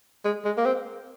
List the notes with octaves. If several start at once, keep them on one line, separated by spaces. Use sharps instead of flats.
G#3
G#3
A#3
C4